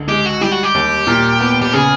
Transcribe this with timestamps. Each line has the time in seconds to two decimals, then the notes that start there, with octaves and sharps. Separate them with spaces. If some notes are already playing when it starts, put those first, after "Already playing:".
Already playing: C#2 D3
0.08 G#3 G4
0.26 F#4
0.41 G3 G4
0.51 F#4
0.63 G4
0.74 D#2
1.07 A#2
1.40 B3
1.62 G4
1.73 C#3 G#4